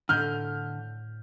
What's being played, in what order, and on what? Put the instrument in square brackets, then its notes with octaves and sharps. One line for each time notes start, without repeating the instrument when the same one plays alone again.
[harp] A2 [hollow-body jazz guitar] D3 [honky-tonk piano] F6 G6